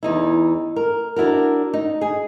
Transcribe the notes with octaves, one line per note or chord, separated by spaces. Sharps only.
E2 D#4 E4
A#4
D4 E4 F#4 A#4
D#4
G#4